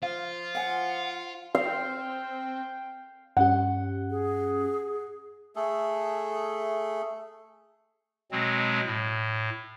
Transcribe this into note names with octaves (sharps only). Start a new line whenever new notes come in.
F3 F4 F5
F5 F#5 G#5
C4 F5 G5
G2 C#4 G4 F#5
G#4
A3 G#4 A4
B2 F#3 G#3 C4
A2